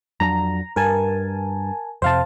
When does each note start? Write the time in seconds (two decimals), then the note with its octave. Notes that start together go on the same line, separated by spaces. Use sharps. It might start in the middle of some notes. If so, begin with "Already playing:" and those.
0.20 F2 F#3 D4 A#5
0.76 G2 A#4 G#5 A5
2.02 F2 C3 C5 F5 A5